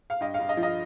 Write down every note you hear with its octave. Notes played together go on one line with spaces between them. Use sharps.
F5
G2 D#5
F5
G2
D#5
F3
D#5